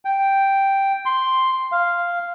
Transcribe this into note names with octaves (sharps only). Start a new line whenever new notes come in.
G5
C6
F5